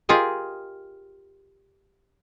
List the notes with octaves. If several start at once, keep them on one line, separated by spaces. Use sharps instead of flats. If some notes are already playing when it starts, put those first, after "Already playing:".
F4 G4 G#4 A#4 D#5